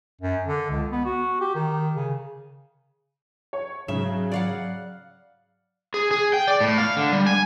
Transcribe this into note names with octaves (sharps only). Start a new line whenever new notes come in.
F#2
D3
C#2
B3
F#4
G4
D#3
C#3
C#5
G#2 C#3 F#3 E5
D5 F5 F#5
G#4
G#4
G5
D5
A2
F5
D3
G3
G#5